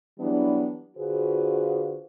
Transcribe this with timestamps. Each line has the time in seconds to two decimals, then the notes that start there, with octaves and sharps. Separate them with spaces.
0.20 E3 F#3 G3 B3 D4
0.97 D3 F4 F#4 G#4 B4 C5